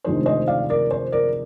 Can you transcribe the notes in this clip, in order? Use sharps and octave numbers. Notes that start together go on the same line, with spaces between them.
F1 D#2 D3 G#3 D#4 C5
C5 D#5
D5 F5
A#4 D5
C5
A#4 D5